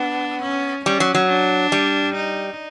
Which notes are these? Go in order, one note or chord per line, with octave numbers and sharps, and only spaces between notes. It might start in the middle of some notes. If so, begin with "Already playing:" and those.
Already playing: B3 D4
C#4
G3 C#4
F#3
F#3
D4
G3
D#4